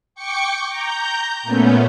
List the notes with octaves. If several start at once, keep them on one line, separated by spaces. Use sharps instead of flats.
G5 C#6 D6 C#7
A#5 G6
A#2 A3 B3 C#4